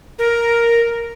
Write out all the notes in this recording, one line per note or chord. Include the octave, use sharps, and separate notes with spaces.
A#4